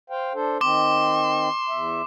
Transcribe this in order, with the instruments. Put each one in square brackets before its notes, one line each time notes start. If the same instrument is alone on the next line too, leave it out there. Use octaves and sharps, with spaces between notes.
[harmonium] C5 F5 G5
D4 A4 C5
[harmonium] D#3 C4 [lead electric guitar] C6 [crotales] D6
[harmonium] E2 E5